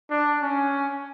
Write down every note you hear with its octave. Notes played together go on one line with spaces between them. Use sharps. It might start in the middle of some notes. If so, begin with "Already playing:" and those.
D4
C#4